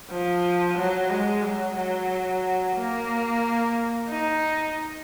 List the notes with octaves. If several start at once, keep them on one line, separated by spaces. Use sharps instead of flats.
F3
F#3
G#3
F#3
F#3
A#3
D#4